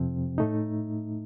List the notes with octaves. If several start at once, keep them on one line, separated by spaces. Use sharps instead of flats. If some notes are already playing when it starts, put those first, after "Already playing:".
Already playing: F2 C3 F3 C4
A2 A3 D#4